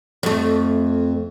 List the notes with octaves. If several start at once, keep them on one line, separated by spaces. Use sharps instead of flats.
F2 A3